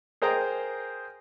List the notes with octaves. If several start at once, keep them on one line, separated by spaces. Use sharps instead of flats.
G#4 A#4 C5 D#5 G5 A#5